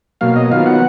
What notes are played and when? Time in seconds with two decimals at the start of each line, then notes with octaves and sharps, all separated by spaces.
0.21 B2 F#3 A#3 F5
0.36 D#5
0.51 D#3 F#3 B3 F4 F5
0.66 F#5